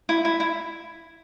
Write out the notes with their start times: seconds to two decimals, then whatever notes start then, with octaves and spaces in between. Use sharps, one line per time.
0.09 E4
0.25 E4
0.40 E4